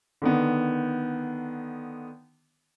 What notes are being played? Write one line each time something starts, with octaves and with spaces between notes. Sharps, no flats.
D3 D#3 B3